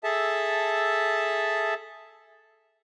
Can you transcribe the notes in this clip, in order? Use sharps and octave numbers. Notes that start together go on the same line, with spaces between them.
G#4 A4 E5 A5